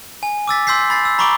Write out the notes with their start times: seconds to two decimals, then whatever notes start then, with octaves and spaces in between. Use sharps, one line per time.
0.23 G#5
0.48 D6 E6 A6 B6
0.67 C6 E6 G6 B6 C7
0.90 B5 A6 C7
1.05 E6
1.19 A#5 B5 C#6 D6 D7 G7